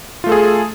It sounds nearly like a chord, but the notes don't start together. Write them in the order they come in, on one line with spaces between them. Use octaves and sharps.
F4 A3 A4 G#4